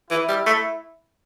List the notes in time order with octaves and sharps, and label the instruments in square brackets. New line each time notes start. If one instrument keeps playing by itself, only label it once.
[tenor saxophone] E3 [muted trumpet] E4
[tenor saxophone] G3
A3